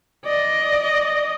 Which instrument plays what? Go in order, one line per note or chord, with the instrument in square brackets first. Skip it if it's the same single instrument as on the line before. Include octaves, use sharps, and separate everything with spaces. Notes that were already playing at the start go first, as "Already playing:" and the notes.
[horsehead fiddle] D5 D#5